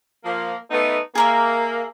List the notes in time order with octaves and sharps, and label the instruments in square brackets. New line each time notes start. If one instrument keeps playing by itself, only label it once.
[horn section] F3 A#3
A3 B3 D#4
[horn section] A#3 [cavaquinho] G#4 A#4 E5